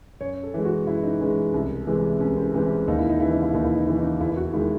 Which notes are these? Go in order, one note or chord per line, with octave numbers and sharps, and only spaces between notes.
F#2 C#5
A4
E3 G#3
F#4
F#2 E4
D#4
E3 G#3 C#4
C#4
C2
C3 E3 G#3
C2 C#4
C4
C3 E3 G#3 C4
C#4
D#2 D#4
E4
D#4
C#3 E3 E4
D#4
E4
D#2 D#4
E4
D#4
C#3 E3 E4
D#4
E2 E4
F#4
D#3 G#3 E4